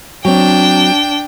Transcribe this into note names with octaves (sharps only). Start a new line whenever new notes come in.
F#3 C4 D4 G5